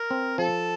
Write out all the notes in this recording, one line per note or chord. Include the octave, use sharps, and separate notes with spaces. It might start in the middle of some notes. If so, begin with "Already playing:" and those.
Already playing: A#4
C4
F3 A4